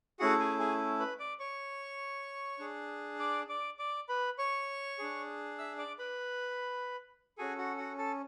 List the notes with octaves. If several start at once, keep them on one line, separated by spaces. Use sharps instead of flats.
A3 C#4 E4 F#4 G#4 F#5
G#4 G#5
G#4 G#5
B4 B5
D5 D6
C#5 C#6
D4 G#4
D5 D6
D5 D6
D5 D6
B4 B5
C#5 C#6
D4 G#4
E5 E6
D5 D6
B4 B5
C#4 F#4 G#4 A4 G#5
F#4 F#5
F#4 F#5
A4 A5